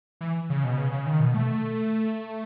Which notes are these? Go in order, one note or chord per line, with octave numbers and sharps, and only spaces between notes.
E3
C#3
B2
C#3
C#3
D#3
B2
A3